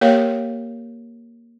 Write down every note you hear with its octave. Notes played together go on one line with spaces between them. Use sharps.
A#3 G4 A#4 C#5 F5